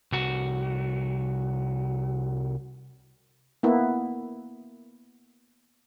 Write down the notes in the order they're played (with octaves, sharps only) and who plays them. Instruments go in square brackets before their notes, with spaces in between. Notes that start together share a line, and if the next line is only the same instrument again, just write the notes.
[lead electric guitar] C2 F#4
[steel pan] A#3 B3 E4